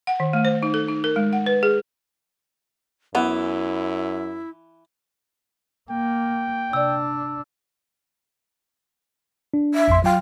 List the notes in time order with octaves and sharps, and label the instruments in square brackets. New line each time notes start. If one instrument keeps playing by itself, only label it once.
[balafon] F#5
D#3
A3
C5
D#4
A4
D#4
A#4
G#3
F#5
B4
G#4
[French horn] F#2 [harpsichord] E3 [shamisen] B3 [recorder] E4
[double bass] A#3 [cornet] G5
[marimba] C3 D5 [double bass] D4 [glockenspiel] E6
[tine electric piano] D4
[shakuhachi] E5
[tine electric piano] A1 F2 C6
[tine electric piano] F#3 G5 [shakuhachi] F4